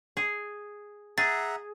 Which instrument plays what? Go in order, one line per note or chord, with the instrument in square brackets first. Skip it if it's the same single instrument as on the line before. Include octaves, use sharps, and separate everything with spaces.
[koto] G#4
[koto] G#4 [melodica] E5 F#5 A#5 [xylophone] A6